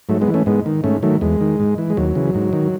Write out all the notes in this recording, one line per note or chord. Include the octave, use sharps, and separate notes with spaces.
G#2 F#3 A3
G#3 B3
E3
A3 C#4
G#2 G#3 B3
D#3
G#2 A3 C#4
D#3 F#3 A3
E2 G#3
D#3
G#2
E3
G#3
D#2 F#3
C#3 E3
G#2
D#3